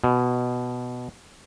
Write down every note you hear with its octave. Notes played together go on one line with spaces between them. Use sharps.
B2